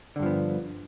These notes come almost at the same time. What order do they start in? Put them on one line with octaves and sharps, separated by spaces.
D3 G2 F3 B3